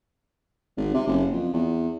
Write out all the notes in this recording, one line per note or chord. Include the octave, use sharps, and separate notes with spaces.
G#1
C3
F#1
F2
E2